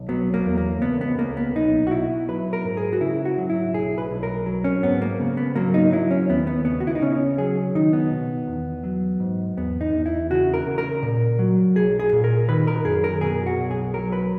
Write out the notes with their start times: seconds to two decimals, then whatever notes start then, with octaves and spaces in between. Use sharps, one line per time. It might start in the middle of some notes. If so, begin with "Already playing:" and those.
Already playing: B1
0.09 F#3 B3
0.34 A#3
0.46 E2
0.57 A#3
0.82 C#2 B3
1.01 B3
1.19 C#2 A#3
1.37 B3
1.56 B1 D#4
1.87 F#4
1.91 B2 E4
2.29 F#3 B4
2.53 A#4
2.65 G#2
2.77 G#4
2.93 F#4
3.00 C#3 E4
3.25 F#4
3.38 F#3
3.50 E4
3.74 B1 G#4
3.98 B4
4.11 B1
4.23 A#4
4.46 F#3
4.64 C#4
4.83 G#2 B3
5.02 A#3
5.20 C#3
5.37 B3
5.55 F#3 A#3
5.74 D#4
5.92 F#3 E4
6.11 C#4
6.29 D#2 B3
6.47 B3
6.65 C#3 B3
6.80 F#4
6.87 E4
6.95 D#4
7.01 C#3 C#4
7.38 F#3 G#4
7.75 D#3 D#4
7.93 B3
8.11 B2
8.47 E2
8.84 F#3
9.20 G#2
9.57 E2 B3
9.81 D#4
9.93 E2
10.06 E4
10.30 C#3 F#4
10.54 A#4
10.67 C#3
10.78 A#4
11.03 A#2
11.39 F#3
11.75 B1 G#4
12.00 G#4
12.13 A#2
12.24 A#4
12.48 D#3 B4
12.67 A#4
12.85 F#2 G#4
13.04 A#4
13.21 B2 G#4
13.46 F#4
13.58 B1
13.71 G#4
13.94 F#3 A#4
14.12 B4